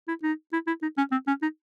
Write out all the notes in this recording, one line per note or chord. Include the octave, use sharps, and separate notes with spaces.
E4
D#4
E4
E4
D#4
C#4
C4
C#4
D#4